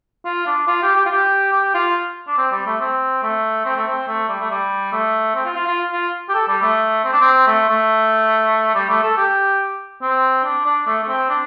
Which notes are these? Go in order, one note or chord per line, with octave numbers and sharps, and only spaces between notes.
F4
D4
F4
G4
G4
F4
G4
G4
F4
D4
C4
G3
A3
C4
A3
C4
A3
C4
A3
G3
A3
G3
A3
C4
F4
F4
F4
F4
G4
A4
G3
A3
C4
D4
C4
A3
A3
G3
A3
A4
G4
C4
D4
D4
A3
A3
C4
D4